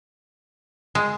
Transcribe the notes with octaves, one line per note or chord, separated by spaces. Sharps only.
G#3